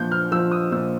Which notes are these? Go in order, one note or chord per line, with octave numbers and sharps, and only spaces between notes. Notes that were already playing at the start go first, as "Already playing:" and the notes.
Already playing: A#2 F3 G6
F6
F3 E6
D#6
A#2 E6